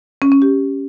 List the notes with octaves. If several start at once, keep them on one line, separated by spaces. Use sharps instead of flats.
C#4
C#4
G4